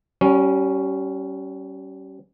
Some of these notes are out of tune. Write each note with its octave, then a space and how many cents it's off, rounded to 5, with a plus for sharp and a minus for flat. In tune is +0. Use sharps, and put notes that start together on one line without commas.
G3 -35 C#4 +0